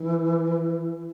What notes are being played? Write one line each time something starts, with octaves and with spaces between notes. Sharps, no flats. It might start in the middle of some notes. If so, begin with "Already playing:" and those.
Already playing: E3